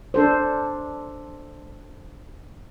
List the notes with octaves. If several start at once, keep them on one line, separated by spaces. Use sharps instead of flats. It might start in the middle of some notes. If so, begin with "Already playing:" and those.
D4 A4 C5